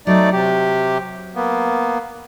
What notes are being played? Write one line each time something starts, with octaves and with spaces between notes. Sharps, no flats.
F#3 A3 D#4 D5
C3 G4
A#3 B3